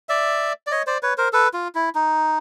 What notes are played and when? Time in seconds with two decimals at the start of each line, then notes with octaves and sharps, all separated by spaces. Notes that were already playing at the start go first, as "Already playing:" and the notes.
0.09 D5 E5
0.67 D5
0.71 C#5 D#5
0.87 C5 D5
1.03 B4 C#5
1.18 A#4 C5
1.33 A4 B4
1.53 F4
1.75 E4
1.95 D#4